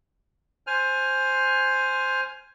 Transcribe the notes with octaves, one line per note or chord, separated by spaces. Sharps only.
C5 G#5 F6